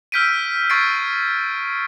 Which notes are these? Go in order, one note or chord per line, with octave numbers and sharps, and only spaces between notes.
E6 F6 G6 B6 D7 D#7
C#6 G#6 A6 C7 D7